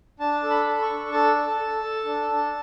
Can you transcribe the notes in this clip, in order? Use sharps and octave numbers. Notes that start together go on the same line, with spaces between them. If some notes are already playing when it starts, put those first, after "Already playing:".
D4 A5
A4
B5
A4
C#6
D4
A4 A5
A4
A4
A4
D4
D4